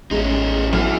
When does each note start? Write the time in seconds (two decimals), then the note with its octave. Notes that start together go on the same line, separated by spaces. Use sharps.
0.11 A1 G#3 C#4 D#4
0.73 B1 E3 E4 F6